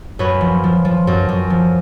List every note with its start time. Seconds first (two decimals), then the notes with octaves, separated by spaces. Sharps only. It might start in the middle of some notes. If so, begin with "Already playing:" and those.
0.19 F#2 B4 C#5
0.41 F3
0.64 F3
0.85 F3
1.07 F#2
1.29 F#2
1.50 F3